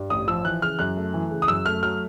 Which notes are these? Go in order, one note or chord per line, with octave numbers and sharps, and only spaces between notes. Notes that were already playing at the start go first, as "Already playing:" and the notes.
Already playing: G2
A1 D#6
F3 E6
E3 F#6
C#3 F6
F#2 F#6
A3
E3
C#3
D#6
F#2 E6
A3 F6
F#3 F6